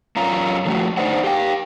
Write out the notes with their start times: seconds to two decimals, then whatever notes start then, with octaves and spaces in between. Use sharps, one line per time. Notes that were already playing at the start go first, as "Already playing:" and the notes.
0.16 F#2 C#4 F4 A#5
0.65 D3 F3 A3 F#4
0.97 D3 D#4 G#4 C5 D5 F#5
1.24 G4 F5 G5